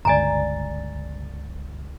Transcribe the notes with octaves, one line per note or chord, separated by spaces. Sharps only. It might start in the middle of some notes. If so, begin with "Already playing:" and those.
G1 C#2 D5 G#5 A#5 A6